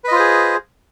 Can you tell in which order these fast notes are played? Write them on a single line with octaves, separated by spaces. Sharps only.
B4 D#5 F4 C5 G#4